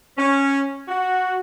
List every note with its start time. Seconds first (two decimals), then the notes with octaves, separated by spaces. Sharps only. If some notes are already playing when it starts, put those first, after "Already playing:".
0.18 C#4
0.88 F#4